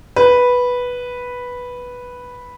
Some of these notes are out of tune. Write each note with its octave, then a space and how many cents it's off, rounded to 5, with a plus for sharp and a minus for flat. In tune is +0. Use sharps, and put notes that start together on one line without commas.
B4 -5